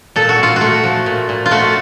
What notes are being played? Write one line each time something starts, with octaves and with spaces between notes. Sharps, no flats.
A#2 A4
F#4
A#2 F4
A3 F#4
F3
A#2
A#2
F4
A3 F#4